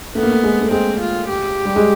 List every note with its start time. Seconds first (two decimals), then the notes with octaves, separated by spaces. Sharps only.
0.15 A3 B3
0.23 A#3
0.31 A3
0.44 G#3
0.61 A3
0.71 G#3 C4
1.01 F4
1.29 G4
1.65 G3
1.76 G#3